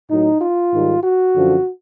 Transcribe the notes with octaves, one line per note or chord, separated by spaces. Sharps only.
A2 F#3 D#4
F4
G#2 D#3 G3
F#4
F#2 D3 F3